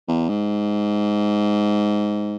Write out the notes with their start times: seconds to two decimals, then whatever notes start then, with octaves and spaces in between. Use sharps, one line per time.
0.09 E2
0.29 G#2